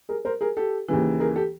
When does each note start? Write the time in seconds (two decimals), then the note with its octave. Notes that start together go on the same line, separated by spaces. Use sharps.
0.09 G#4 A#4
0.25 A#4 C5
0.41 G#4 A#4
0.57 G4 A4
0.88 D#2 C#3 E3
1.20 G#4 A#4
1.36 G4 A4